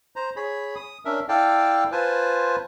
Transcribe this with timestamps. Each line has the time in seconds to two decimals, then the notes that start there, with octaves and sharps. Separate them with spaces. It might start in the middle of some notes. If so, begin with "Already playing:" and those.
0.16 C5 A#5
0.36 G#4 C#5 B5
0.76 D#6
1.05 C#4 D4 A#4 E5
1.29 E4 A4 D5 F5 G5 A5
1.92 F4 B4 C5 G#5 A5